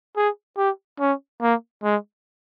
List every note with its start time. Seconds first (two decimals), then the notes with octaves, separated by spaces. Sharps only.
0.16 G#4
0.57 G4
1.00 C#4
1.42 A#3
1.83 G#3